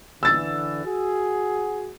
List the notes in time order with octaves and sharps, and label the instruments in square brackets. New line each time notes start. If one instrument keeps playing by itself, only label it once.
[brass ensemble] D3 E3 [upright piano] E6 A6
[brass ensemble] F#4 G#4